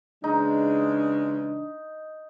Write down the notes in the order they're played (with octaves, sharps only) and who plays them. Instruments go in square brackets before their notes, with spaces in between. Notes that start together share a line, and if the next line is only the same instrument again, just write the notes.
[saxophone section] C#3 E3 G#3 [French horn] D4 [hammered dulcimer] D#4